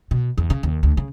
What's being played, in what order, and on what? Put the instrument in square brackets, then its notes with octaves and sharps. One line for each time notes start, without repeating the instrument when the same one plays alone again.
[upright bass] B2
E2
C#3
D#2
D2
C#3